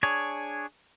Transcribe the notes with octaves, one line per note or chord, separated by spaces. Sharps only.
D4 G#4 C#5